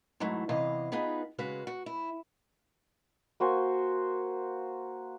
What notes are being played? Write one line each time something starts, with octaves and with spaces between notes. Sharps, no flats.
G#2 E3 F#3 A3
E2 C3 E3 D#5 F5
B3 D#4 F4 G#4 B4
C#3 G#3 F#4 B4 F5
F#4
E4
A#3 F#4 C5 G#5